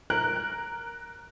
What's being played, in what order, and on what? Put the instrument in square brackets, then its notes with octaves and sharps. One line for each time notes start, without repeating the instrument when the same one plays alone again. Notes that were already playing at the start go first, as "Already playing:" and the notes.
[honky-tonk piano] A#4 F#6